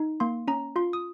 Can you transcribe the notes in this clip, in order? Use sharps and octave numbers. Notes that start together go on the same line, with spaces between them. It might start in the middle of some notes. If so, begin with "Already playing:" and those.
Already playing: D#4
A#3 C6
C#4 A#5
F4 C6
D#6